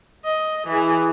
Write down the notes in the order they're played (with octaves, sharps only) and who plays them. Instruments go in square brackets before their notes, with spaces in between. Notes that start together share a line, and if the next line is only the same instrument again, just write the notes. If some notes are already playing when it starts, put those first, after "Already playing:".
[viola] D#5
E3 G#4